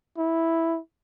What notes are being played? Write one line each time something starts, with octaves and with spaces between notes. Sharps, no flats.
E4